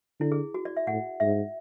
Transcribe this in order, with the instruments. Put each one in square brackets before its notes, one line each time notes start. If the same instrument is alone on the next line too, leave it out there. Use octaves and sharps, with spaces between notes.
[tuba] D3 [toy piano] E4
[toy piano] G#4
F#4
D5
E5
[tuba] A2 [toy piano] F#5
[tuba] G#2 [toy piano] E5